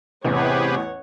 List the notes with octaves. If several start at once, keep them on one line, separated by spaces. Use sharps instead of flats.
A1 E2 C3 G4 G#4 B4 C#5 F#5